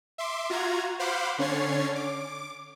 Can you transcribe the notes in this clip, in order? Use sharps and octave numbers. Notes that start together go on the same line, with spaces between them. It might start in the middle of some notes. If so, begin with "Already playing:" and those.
E5 C6 D6
F4 F#4 A#5 G#6
C5 F5 F#5 B5 C6 D6
D3 C#4 C#5 G#6 A6 C7
D6